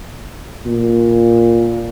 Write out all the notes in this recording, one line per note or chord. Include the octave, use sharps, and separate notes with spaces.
A#2